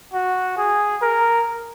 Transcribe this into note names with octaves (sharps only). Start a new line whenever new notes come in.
F#4
G#4
A#4